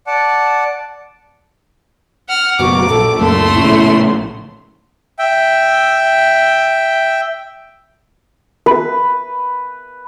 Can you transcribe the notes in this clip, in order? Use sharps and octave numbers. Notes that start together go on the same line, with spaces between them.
D5 F#5 A5
F#5 F6
F#1 B2 F#4 D6
A#1 A4
C#2 F#2 A3 A#3 C6
A#1 A2 C#3 E4
E5 G5
B4